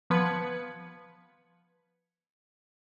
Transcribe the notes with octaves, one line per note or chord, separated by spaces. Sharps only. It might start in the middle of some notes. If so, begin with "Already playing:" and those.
F3 B3 B4 G#6 C#7